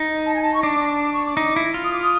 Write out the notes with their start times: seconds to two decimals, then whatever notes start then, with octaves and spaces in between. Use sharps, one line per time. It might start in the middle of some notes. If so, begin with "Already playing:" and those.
Already playing: D#4
0.25 A5
0.34 G#5
0.42 A5
0.54 C#6
0.63 D4 D6
1.00 D6
1.13 C#6
1.26 D6
1.37 D#4
1.56 E4
1.74 F4
1.84 D#6
1.93 D6
2.03 D#6